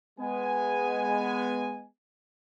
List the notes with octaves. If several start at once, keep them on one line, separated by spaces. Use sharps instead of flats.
G#3 B3 G#5